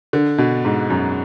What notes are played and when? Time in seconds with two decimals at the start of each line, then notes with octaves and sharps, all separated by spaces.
0.13 D3
0.38 B2
0.65 G#2
0.90 F#2